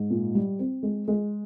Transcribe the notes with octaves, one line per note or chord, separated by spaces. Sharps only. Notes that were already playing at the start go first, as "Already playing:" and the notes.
Already playing: G#2
A#2
G3
C4
G#3
G#3